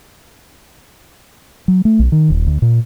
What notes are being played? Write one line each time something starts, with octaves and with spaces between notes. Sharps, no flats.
F#3
A3
B1
D#3
D#1
D2
A#2